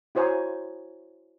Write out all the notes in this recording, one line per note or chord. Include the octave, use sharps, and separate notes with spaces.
E4 F#4 C5 C#5 G#5 A#5